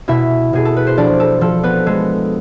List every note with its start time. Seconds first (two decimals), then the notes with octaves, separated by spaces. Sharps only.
0.08 B2 E4 E5
0.53 B2 G#4
0.65 A4
0.77 B4
0.87 C5
0.97 F3 D4 D5
1.20 A4
1.41 F3 A4
1.63 B3 B4
1.86 G#3 A4